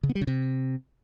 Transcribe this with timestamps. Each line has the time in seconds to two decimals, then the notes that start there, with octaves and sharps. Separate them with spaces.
0.03 C#3
0.09 B3
0.15 G3
0.21 C#3
0.27 C3